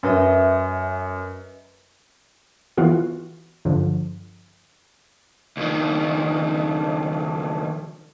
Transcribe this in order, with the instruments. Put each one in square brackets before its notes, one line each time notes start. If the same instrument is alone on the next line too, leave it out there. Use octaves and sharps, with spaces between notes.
[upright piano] F#2 [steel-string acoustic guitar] B4 D#5 E5
[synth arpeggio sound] E3 B3 F4 F#4
G2 D3 F3
[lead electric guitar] C#2 D#3